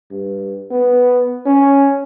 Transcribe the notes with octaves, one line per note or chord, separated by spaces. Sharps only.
G2
B3
C#4